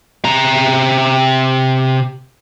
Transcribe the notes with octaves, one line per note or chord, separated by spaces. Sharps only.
C3 A#5